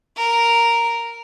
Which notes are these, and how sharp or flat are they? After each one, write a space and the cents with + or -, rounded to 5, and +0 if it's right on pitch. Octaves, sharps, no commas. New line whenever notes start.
A#4 +0